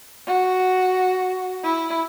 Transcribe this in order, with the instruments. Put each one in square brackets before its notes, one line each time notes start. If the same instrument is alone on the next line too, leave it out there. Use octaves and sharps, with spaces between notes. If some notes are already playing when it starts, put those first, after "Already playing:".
[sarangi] F#4
E4